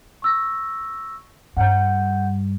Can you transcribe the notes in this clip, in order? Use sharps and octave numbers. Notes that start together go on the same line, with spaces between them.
C#6 E6 A#6
G2 F#5 G6